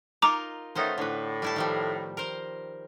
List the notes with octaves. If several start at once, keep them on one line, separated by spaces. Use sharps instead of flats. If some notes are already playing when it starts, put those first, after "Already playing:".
D#4 F4 A#4 A#5 D6
D#3 A3 B3 C#4 D#4 C5
A2 D3 B4
G3 E4 A5
D#3 F3 G3
A#4 C5